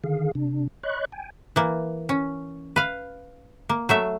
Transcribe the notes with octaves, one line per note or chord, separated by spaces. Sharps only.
D3 D#3 G#4 F5
C3 D4
C#5 D#5 B5 C#6 F#6
G5 G#5
E3 A#3
C#4
B4 F5
A#3
F#3 A3 E5